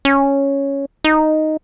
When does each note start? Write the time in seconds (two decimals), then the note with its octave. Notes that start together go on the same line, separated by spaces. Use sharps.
0.05 C#4
1.04 D#4